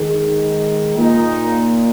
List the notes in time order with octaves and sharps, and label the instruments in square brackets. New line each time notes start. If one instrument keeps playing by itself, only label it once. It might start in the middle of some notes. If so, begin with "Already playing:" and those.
Already playing: [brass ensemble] D#3 G#3
A#2 A#3 D#4